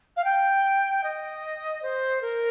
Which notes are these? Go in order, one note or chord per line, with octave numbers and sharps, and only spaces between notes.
F5
G5
D#5
C5
A#4